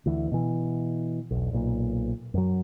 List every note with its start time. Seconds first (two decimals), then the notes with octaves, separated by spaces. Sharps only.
0.06 D2 E3
0.31 B2 E3
1.31 E1 B1
1.53 B1 A#2
2.34 F#2 F#3